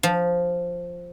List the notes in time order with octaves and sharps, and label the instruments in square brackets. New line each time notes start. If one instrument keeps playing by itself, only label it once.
[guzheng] F3